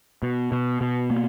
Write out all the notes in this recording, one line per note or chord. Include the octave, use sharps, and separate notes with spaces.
B2
B2
B2
A#3